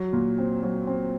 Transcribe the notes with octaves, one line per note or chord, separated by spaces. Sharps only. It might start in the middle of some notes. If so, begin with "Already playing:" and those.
Already playing: F#3
A#2
C4
F#3
C4